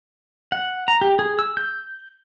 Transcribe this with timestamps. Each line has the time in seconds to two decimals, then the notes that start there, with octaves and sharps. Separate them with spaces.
0.52 F#5
0.88 A#5
1.01 G4
1.19 G#4
1.39 E6
1.57 G6